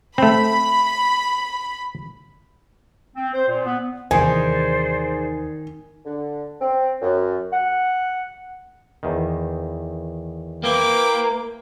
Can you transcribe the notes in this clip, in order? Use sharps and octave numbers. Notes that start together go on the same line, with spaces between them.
A3 C4 B5
C4
C5
A#2
B3
D#2 C3 D#3 E3 G#4 C5 D5 G#5
D3
C4
F#2
F#5
E2 D#3
A#3 E4 B4 G5 D6